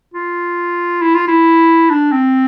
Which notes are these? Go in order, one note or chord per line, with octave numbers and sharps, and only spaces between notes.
F4
E4
F4
E4
D4
C4